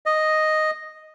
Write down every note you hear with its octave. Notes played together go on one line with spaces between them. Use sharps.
D#5